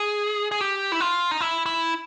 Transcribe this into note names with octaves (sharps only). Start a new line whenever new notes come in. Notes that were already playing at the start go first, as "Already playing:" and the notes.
Already playing: G#4
G#4
G4
E4
F4
D#4
E4
E4